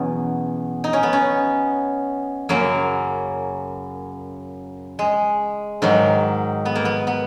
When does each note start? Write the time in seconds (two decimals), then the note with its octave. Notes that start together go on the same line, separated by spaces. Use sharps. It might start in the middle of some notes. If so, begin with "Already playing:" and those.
Already playing: E2 B2 F#3 B3 C#4
0.84 D#4
0.93 C#4
1.03 B3
1.13 C#4
2.49 F#2 C#3 F#3 A#3
4.99 G#3
5.82 G#2 D#3 F#3
6.65 B3
6.75 A#3
6.85 B3
7.07 B3